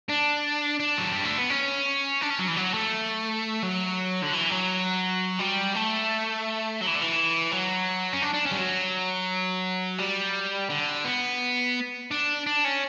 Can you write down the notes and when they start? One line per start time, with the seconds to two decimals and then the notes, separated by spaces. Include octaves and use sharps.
0.09 D4
0.80 D4
0.98 F#3
1.12 G3
1.24 A3
1.38 B3
1.50 C#4
2.22 D4
2.30 C#4
2.39 F#3
2.48 E3
2.57 F#3
2.74 A3
3.63 F#3
4.23 D3
4.33 E3
4.51 F#3
5.40 G3
5.74 A3
6.81 F#3
6.87 E3
6.95 D3
7.02 E3
7.51 F#3
8.13 C#4
8.22 D4
8.34 D4
8.46 C#4
8.52 G3
8.58 F#3
9.98 G3
10.70 D3
11.05 B3
12.11 D4
12.46 D4
12.64 C#4